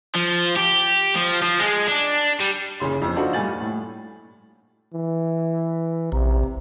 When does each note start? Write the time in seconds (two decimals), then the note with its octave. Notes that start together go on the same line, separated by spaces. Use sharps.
0.15 F3
0.57 G4
1.16 F3
1.42 F3
1.59 G#3
1.88 D4
2.40 G3
2.80 F#1 A#2 C#3 C6
3.02 F2 F3
3.16 D4 D#4 F4 F#4 A4 C5
3.33 G2 A#2 A3 G#5 A6 F#7
3.61 A2
4.94 E3
6.12 A#1 C3